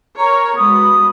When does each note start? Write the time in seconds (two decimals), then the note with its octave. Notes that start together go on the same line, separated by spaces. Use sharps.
0.18 A#4 C#5 A#5
0.56 G#3 B3 F#4 D#6